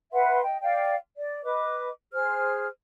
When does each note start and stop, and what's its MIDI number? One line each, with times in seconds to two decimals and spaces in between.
0.13 0.41 71
0.13 0.41 76
0.13 0.41 78
0.13 0.41 84
0.43 0.60 75
0.43 0.60 79
0.62 0.95 74
0.62 0.95 77
0.62 0.95 79
1.17 1.43 74
1.44 1.89 71
1.44 1.89 75
1.44 1.89 86
2.12 2.67 68
2.12 2.67 72
2.12 2.67 89